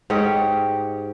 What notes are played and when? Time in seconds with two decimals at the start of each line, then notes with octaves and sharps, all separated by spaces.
0.10 G#2 G4 C#5 D#5